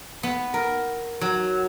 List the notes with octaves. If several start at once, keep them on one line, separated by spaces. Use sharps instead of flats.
B3
A#4
F#3